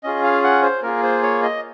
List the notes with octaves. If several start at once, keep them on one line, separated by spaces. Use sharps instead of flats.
C#4 F4 G#4 D#5
F5
F#5
C5
A#3 F4 G#4 A#4
C5
C#5
D#5